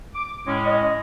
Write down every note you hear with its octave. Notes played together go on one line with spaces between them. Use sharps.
D6
A2 G#3 C#4
D#5